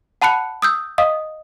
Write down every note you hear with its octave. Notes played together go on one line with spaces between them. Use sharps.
F#5 A5 B5 F#6 C#7
D#6 E6 G6
D#5 F5 D#6